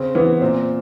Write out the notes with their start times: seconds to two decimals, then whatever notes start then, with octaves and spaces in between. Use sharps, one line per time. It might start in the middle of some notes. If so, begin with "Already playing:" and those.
Already playing: C#3 C4
0.15 E3 B3
0.41 A#2 C4